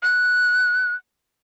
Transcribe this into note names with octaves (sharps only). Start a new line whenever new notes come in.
F#6